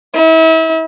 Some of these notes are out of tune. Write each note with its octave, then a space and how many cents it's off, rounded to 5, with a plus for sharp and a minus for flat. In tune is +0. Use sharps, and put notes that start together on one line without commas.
E4 -35